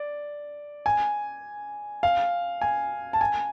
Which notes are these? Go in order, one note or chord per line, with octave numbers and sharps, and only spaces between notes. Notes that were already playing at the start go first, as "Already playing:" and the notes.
Already playing: D5
G#5
F5
G#5
A5
G#5